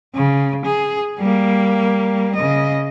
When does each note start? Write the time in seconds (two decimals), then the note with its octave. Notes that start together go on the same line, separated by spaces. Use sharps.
0.15 C#3
0.65 G#4
1.19 G3 A#3
2.36 C#3 D#5